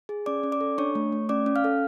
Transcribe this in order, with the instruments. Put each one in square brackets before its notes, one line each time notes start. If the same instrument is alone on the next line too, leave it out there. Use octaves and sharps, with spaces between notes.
[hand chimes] G#4
C#4 D5 D6
C#4
D5 D6
A4
D4 C#5 C#6
A3
A3
C#4 D5 D6
C#4
F5 F6
A4